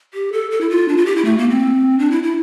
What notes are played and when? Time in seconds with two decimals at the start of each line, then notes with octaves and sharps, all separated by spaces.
0.14 G4
0.33 A4
0.51 A4
0.61 E4
0.70 F4
0.88 D4
0.97 F4
1.06 G4
1.16 E4
1.25 A3
1.38 A#3
1.49 C4
1.99 D4
2.11 E4
2.23 E4